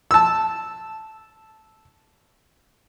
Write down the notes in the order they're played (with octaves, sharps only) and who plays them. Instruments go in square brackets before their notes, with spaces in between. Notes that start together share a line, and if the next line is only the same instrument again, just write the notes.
[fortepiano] A5 E6